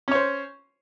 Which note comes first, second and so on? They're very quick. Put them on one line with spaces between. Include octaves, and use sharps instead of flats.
C#4 C#5 C5